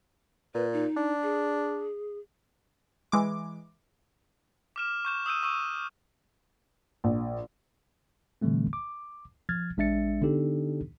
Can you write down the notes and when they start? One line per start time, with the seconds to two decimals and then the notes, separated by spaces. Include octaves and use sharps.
0.54 A#2 B4
0.73 D#4
0.96 D4
1.23 G#4
3.12 E3 G#3 D6
4.76 D6 F6 E7
5.05 C#6 G6 E7
5.26 D#6 E6 G6 D#7
5.43 C#6 E6 D#7
7.04 A#1
8.41 A#2 D3 E3 G3 A3 C4
8.73 D6
9.49 F3 F6 G#6 A6
9.77 A1 G#3 D4 E5 A6 C#7
10.22 D3 B3 D4 D#4 G4 A4